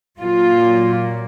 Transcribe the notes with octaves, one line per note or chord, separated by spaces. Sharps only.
A#2 F#3 A#3 F4